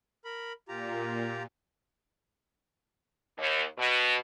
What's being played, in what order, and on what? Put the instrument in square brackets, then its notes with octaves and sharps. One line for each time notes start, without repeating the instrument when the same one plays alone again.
[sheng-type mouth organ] A#4 B5
[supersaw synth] A#2 [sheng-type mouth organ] F4 G4 A#5
[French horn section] D#2
B2